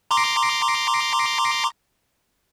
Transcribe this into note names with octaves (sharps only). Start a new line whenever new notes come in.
A#5 C6 D6